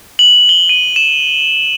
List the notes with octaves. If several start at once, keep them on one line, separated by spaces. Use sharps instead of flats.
F#7
G7
D#7
E7